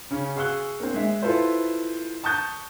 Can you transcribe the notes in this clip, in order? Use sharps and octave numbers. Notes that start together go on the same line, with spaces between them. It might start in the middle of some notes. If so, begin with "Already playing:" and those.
C#3 C#4
G#4 F5 C#6 E6 F#6 G7
A#3 C4
G#3 E5
E4 F4 A4 B4 C5
A5 C#6 D#6 F#6 G6 A6